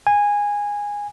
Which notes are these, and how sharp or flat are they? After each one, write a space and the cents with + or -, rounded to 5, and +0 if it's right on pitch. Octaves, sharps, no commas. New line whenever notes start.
G#5 -15